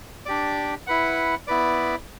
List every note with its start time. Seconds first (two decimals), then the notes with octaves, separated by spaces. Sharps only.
0.26 D4 G4 D5
0.87 E4 B4 F#5
1.47 B3 E4 B4 D5